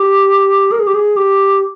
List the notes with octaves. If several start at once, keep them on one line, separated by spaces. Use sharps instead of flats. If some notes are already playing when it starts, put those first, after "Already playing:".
Already playing: G4
A#4
G#4
G4
G#4
G4